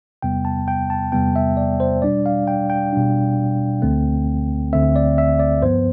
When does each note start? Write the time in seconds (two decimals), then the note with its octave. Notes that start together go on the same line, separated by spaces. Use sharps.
0.22 E2 C3 G3 B3 G5
0.45 A5
0.68 G5
0.90 A5
1.12 E2 C3 G3 B3 G5
1.36 E5
1.57 D5
1.80 C5
2.02 B2 G3 D4 D5
2.26 F5
2.47 G5
2.70 G5
2.93 B2 G3 D4
3.82 D2 D3 A3 C4
4.73 D2 D3 A3 C4 E5
4.96 D5
5.18 E5
5.40 D5
5.62 G2 F3 B3 C5